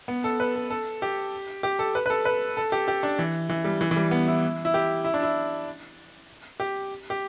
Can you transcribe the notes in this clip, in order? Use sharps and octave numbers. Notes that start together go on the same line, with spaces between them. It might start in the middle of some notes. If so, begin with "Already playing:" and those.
B3
A4
B4
A4
A4
G4
G4
A4
B4
B4
A4
B4
A4
G4
G4
D4
E3
E3
G3
E3
E3
G3
B3
E4
E4
G4
E4
D4
E4
G4
G4